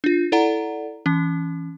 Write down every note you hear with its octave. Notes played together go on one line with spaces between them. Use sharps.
D4 F4
E4 A4 D5 F#5 A#5
E3 C#4